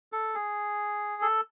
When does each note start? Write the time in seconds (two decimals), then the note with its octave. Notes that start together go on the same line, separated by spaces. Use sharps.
0.12 A4
0.35 G#4
1.22 A4